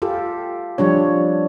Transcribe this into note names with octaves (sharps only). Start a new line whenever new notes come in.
F4 G4 A4
F3 G3 D4 C#5